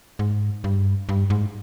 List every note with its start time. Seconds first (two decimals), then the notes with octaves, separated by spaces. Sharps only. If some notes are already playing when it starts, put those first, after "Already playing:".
0.19 G#2
0.64 G2
1.09 G2
1.30 G#2